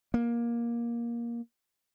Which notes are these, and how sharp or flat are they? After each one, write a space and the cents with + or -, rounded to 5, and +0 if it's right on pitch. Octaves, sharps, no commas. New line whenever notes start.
A#3 +15